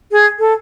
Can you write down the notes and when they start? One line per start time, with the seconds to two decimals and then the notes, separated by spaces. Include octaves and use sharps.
0.12 G#4
0.39 A4